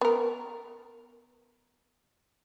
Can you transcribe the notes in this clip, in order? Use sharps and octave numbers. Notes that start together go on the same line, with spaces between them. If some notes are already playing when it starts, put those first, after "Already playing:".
B3 A#4